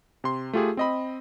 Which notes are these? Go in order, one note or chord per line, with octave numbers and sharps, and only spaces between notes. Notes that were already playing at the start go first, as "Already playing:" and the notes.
C3 C6
A3 F4 G4 G#4
C4 D#5 B5